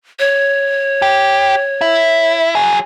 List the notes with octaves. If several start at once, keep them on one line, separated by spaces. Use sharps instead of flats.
C#5
G4
E4
F#3 G#4